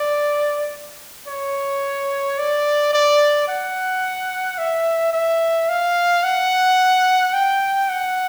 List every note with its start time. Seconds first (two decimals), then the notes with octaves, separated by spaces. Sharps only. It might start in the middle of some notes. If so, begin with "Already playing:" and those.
Already playing: D5
1.28 C#5
2.38 D5
2.93 D5
3.48 F#5
4.58 E5
5.13 E5
5.69 F5
6.23 F#5
7.34 G5
7.89 F#5